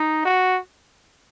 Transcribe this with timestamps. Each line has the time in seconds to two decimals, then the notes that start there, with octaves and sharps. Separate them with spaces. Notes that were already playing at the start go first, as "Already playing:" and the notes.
Already playing: D#4
0.25 F#4